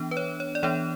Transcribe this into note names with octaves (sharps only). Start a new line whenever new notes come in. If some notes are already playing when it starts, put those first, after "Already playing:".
Already playing: E3 B3 D4
B4
C#5
C#5
D5
E3 B3 D4 C#5